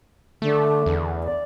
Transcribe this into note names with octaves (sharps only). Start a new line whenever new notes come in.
D3 A3
E2
D5